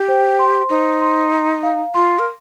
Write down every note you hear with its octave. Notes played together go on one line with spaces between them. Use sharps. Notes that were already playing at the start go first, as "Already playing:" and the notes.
Already playing: G4 G5
C5
C6
D#4 C5
C6
A#5
F5
F4 C6
A#4